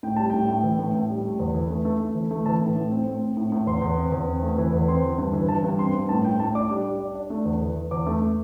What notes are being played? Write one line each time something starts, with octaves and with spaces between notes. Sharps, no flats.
A2 G5
G3 A5
A2 G5
A2
E3
A2
A2
G3
A3
E2
E3
A3
A3
A3
E3
A3
E3 A5
A2
A2
C4
A2
C4
A2
A2
E2 C6
E2
C4
E2
C4
A3
E3
E2
C4 C6
E3
G2
E3
E3 A5
G2
C4 C6
G2
A2 A5
A2 G5
A2 A5
D4 D6
G3 D6
G3
D4
D4
A3
E2
E3
E3
E2 D6
A3
A3